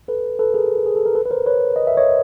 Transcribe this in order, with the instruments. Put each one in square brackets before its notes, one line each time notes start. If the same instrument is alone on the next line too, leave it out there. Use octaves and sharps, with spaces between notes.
[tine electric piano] A4 B4
A4 B4
G#4 A#4
G#4
A4
A#4
A4 B4
B4
A#4 C5
B4 C#5
D#5
E5
C#5 D#5